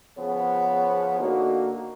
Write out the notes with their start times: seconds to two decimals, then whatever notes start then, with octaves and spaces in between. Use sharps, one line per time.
0.18 C#3 F3 B3 G#4 C5 C#5
1.19 D3 A#3 D#4 F#4